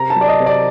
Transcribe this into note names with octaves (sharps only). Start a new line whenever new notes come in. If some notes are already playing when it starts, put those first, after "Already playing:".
Already playing: C3 A#5
A5
F#3
D5
D#5
C3
D5